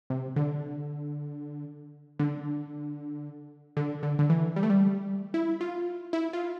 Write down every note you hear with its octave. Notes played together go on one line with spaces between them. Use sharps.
C3
D3
D3
D3
D3
D3
E3
G3
A3
G3
E4
F4
E4
F4